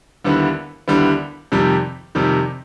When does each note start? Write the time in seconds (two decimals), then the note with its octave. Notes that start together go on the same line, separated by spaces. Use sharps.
0.24 D#2 D3 G3 B3 E4
0.88 D#2 D3 G3 B3 E4
1.52 F2 C3 D#3 G3
2.15 F2 C3 D#3 G3